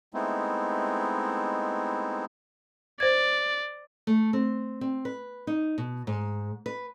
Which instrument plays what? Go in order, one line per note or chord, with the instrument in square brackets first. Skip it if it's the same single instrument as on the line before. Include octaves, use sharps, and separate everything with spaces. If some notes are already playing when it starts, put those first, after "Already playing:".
[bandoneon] G#3 A3 B3 C4 D#4 E4
[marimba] C5 G#6 [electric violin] D5
[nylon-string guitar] A3
C4
C4
B4
D#4
B2
G#2
B4